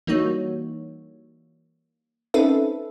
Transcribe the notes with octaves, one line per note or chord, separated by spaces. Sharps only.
E3 G3 A#3 D#4 F#4 C#5
C4 C#4 D#4 A4 B4 E5